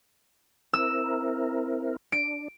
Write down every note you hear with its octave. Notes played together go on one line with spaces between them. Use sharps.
C4 E4 A#4 E6
D4 D7